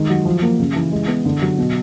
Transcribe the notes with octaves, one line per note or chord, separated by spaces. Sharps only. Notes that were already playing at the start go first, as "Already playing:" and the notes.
Already playing: D#3 G#3
F#3
F3
A#3
C#3
E3
G#3
B3
D3
F#3
B2